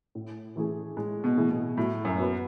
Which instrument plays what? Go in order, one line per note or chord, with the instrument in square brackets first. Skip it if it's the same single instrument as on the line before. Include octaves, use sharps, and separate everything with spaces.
[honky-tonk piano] A2
E3 A3 E4 G#4
[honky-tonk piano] A2 [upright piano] G#3
[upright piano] B2
[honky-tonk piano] E3 A3 E4 G#4
[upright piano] B2
[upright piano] A2 [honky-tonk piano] F#3
[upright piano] F#2
[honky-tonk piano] B3 F#4 B4